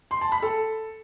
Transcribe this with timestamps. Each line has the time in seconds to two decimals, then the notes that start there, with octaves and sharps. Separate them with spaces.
0.11 C6
0.21 A5
0.32 B5
0.42 A4